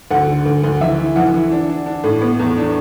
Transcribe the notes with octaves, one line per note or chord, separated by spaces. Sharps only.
D2 F#5
D3
D2
D2
E3 E5
E4
E3 F#5
E3
D4
D4
D4
A2
B3
E2
D4